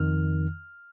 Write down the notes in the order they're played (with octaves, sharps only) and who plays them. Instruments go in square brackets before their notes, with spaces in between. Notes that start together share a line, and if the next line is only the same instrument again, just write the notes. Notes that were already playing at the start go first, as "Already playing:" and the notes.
Already playing: [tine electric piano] F2 D#3 F6